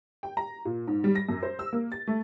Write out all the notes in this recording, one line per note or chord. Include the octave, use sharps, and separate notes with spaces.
G5
A#5
A#2
G#2
G3
A#6
F#2
C5
E6
A#3
A6
A3